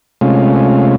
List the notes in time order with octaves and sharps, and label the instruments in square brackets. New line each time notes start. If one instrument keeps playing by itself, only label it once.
[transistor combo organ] C3 G#3 A3 C#4 F4